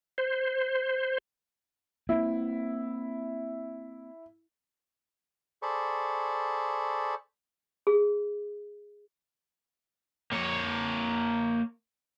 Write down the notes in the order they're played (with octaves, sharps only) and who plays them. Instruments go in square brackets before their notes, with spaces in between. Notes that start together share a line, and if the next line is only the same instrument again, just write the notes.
[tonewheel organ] C5
[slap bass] A#3 C4 [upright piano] E4
[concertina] G#4 A4 C5 D5 B5 C#6
[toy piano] G#4
[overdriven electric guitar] A#3 C#5